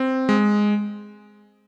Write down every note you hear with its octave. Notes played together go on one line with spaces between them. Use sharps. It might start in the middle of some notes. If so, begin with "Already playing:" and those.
Already playing: C4
G#3